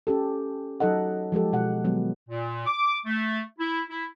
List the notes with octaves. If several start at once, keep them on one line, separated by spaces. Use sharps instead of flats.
C#4 G4 A4
F#3 D#4 A4 D#5 F#5
F3 G#3 G4 A4
B2 G#3 F#5
D#3 F#3 G#3 B3
A#2
D6
A3
E4
E4